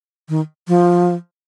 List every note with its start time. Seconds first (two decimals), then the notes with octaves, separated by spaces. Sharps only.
0.29 D#3
0.68 F3